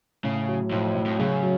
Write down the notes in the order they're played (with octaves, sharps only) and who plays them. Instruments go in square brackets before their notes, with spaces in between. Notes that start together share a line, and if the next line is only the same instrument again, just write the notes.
[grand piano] A2 [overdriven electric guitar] C#3
[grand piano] F#3
[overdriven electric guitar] F2 [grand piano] A2
[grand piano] A2
[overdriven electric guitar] F2
[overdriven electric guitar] F#2 [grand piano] C#3
[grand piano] F#3